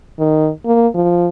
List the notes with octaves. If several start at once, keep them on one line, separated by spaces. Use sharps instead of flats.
D#3
A#3
F3